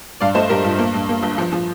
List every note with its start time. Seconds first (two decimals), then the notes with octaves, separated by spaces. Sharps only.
0.20 G2 D5 F5
0.35 A3 C5 D#5
0.49 G2 G4 A#4
0.64 G2 F4
0.79 A#3
0.94 G2
1.09 A#3
1.23 G1
1.38 F3
1.53 F3